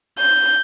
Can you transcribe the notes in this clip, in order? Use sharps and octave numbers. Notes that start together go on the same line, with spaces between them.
G6